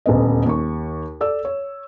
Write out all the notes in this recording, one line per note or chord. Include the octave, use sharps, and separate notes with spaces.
D#1 D2 B3 D#5
D#2 C#6
A4 D5 E6
C#5